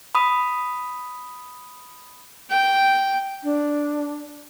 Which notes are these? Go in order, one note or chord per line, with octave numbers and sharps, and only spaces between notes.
B5 D#6
G5
D4